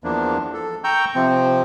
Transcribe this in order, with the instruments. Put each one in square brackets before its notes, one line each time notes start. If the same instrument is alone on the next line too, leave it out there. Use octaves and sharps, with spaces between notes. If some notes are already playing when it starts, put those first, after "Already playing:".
[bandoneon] E2 F3 A#3 D4
A4
G5 A#5 C#6 E6 G6
C3 F3 C4